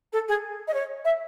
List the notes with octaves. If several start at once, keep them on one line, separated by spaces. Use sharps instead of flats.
A4
G#4
D#5
C#5
E5